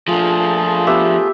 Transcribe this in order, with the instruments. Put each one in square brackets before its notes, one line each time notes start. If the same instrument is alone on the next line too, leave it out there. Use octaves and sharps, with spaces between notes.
[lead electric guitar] F3 D4 [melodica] A3 F4 G#4
[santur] B3 G4 E5